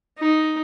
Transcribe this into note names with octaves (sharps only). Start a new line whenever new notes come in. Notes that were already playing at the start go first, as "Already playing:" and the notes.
D#4